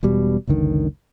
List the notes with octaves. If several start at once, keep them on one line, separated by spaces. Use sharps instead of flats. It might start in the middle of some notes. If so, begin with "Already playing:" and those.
E1 B2 G3
F#1 C#2 D3 D#3